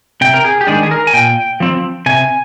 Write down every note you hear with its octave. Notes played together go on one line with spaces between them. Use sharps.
C3 G5
A#4
G#4
G4
D#3 G#3 D4 G#4
G#4
A#4
G#5
A#2 G5
F3 C4
C3 G#5